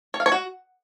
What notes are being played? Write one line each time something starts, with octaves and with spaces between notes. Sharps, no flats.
C#5
F5
C#5
F#4